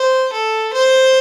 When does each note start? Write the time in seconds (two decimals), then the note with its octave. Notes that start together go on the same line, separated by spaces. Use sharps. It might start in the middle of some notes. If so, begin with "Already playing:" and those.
Already playing: C5
0.33 A4
0.74 C5